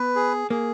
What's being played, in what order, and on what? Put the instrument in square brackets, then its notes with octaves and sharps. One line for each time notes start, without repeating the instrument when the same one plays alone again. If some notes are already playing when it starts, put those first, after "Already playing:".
Already playing: [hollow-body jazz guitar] B3 [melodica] B4
[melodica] G#4
[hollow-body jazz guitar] A#3 [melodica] G#4